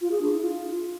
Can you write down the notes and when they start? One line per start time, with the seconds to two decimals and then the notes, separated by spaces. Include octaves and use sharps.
0.01 F4
0.11 G#4
0.21 D4
0.32 E4
0.42 F4